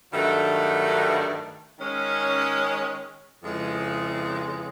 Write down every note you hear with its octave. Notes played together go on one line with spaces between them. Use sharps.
G2 D#3 F#3 A3 D4
D#3 G#3 C#4
F2 C#3 E3 G#3